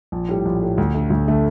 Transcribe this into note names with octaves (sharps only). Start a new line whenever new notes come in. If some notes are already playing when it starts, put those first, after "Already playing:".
A#1
A2 G3
A#1
A2 G3
D2
D3 A3
D2
D3 A3